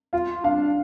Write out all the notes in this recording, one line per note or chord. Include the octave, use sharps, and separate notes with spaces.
F4 F5
D4 F5